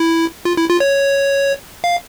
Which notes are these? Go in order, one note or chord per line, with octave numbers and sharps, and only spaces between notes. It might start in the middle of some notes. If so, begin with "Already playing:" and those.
Already playing: E4
F4
E4
F4
C#5
F5